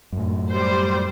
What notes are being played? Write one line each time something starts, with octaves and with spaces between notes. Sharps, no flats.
F#2 A2
G3 C5